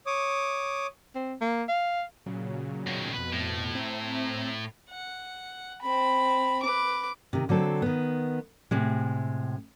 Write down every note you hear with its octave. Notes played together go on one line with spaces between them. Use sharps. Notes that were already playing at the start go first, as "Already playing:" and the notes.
C#5 D6 D#6
C4
A#3
F5
A#2 C#3 F#3
B2 D#3
F2 B2 B4
A2
C4 E5 A#5
F#5
C4 B5
B4 D6
C3 D#3
D3 F#3 C4 A4
D#3 B3
A2 C3 G#3